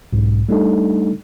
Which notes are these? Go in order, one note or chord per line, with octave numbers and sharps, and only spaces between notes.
B1 G#2
G3 A3 D4 D#4 A4